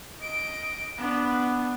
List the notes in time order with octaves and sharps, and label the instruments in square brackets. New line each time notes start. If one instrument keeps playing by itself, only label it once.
[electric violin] D#5 D7
B3 D4